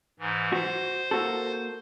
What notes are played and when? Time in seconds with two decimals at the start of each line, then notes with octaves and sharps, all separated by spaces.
0.19 G#2 E3
0.52 F#4 C5
1.11 A#3 F#4 A4